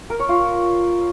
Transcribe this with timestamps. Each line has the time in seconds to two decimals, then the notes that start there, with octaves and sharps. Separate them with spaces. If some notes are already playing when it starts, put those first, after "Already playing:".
0.10 A#4
0.19 C#5
0.29 F4